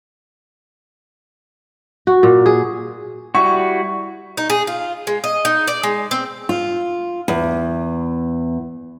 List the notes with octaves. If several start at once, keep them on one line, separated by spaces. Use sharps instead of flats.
F#4
A#2
G#4
G3 E4 F#4 C#6
D#4
G#4
F4
G#3
D#5
D#4
D5
G#3
C4
F4
E2